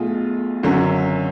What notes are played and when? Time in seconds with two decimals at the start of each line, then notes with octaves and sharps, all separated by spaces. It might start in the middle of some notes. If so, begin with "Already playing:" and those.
Already playing: B1 B2 A3 F4 G#4
0.63 G#1 F#2 D3 F#3 C#4